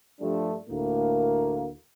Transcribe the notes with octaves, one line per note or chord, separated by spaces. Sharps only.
G2 F3 G3 A3 D4
D2 A2 A#3